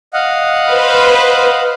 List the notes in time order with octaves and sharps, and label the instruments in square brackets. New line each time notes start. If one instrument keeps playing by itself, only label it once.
[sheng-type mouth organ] D#5 F5 F#5
[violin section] B4 C5